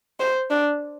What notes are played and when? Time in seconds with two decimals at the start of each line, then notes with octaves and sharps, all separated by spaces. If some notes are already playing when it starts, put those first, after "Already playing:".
0.20 C5
0.50 D4